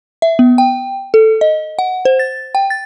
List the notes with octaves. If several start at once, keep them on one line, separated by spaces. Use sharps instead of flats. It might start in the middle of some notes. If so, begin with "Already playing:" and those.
E5
B3
G5
A4
D#5
F#5
C5
A6
G5
A6